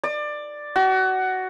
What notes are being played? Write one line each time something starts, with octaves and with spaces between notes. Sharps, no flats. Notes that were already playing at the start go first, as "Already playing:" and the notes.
D5
F#4